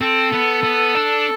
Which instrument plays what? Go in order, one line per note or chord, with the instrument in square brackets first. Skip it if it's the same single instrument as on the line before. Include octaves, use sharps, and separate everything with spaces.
[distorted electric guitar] C4 [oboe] A4
[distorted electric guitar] B3
B3
D4